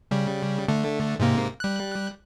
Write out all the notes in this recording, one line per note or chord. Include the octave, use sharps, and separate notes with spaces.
C#3 G3
D3 A3
G#2 C3 A#3
G3 F#6